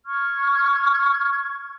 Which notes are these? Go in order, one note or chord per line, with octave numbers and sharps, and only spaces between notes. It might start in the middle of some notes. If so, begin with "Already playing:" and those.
C#6 F6 G#6